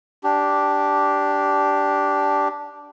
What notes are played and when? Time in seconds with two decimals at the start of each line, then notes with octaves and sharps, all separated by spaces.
0.23 D4 G4